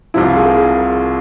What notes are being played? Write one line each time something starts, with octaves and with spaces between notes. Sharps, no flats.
C2 C3 F3 E4
F4
G#4
A#4
G#4